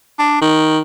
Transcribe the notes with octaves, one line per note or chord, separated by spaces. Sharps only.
D4
D#3